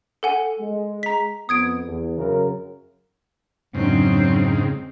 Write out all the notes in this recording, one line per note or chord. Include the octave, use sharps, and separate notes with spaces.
A4 F#5 G#5
G#3
A#5 B6
F2 B3 D#6 G#6 D7
E2
F#2 C#3 A#4
F2 G#2 C#3 F#3 C4 D4